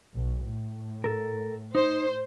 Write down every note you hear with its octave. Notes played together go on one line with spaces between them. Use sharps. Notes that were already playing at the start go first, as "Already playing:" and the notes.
B1
A2
A4 A#4
D#4 C5